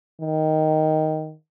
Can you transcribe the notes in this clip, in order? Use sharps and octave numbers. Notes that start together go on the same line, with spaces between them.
D#3